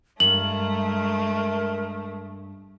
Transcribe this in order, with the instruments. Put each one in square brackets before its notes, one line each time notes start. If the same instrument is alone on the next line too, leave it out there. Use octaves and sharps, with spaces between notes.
[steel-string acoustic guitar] G2 [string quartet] G#3 A3 [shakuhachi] A#4 [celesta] F#7